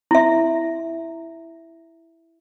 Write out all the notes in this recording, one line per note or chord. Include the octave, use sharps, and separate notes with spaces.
E4 E5